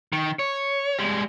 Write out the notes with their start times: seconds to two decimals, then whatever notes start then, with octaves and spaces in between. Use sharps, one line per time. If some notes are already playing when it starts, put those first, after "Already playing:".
0.13 D#3
0.39 C#5
0.99 G3 G#3